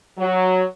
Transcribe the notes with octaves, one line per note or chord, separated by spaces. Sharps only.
F#3